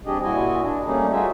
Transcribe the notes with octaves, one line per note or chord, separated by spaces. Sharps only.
G3 C4 D4 G4 G#4 D#5
A#2 E4 F#4 D#5 G#5
D4
G3 A3 A#3 C#4 D#4 G#4
D#4 F4 F#4 G#4 E5